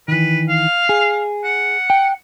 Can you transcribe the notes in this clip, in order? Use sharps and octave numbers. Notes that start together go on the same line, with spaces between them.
D#3 E3 B4
F5
G#4
F#5
G5